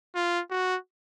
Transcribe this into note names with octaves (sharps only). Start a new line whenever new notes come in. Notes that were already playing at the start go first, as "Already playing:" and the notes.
F4
F#4